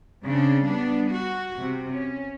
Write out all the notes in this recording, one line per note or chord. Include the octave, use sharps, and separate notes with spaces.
C#3 C4 D4
G3 B3 D4
F#4
C3
C#4